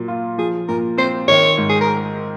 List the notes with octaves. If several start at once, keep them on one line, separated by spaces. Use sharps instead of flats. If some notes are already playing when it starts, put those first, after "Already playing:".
Already playing: A#2 F#3
F4
F3 G#4
A#2 A#4
C4 C5
D#3 C#5
G#2
G#4
A#4